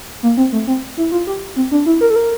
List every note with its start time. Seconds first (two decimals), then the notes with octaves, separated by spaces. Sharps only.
0.23 A#3
0.37 C4
0.52 A3
0.67 C4
0.97 E4
1.12 F4
1.27 G4
1.56 C4
1.71 D4
1.86 E4
2.01 A#4
2.10 A4
2.16 A#4